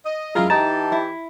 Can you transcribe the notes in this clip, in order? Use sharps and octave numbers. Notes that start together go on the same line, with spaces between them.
D#5
F#2 G#3 E4 F4 G#4 A#4 A#5
E3 D#4 G4 A5 A#5
E4